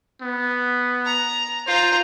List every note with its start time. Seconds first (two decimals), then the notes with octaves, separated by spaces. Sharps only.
0.22 B3
1.05 A#5
1.67 F4 C5 A#5